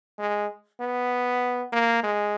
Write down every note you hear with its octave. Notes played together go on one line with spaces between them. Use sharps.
G#3
B3
A#3
G#3